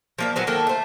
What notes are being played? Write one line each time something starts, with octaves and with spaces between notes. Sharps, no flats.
F3 A#3 E5
A#2 F#3 B3 C5
D#3 A#3 A4
A3 C5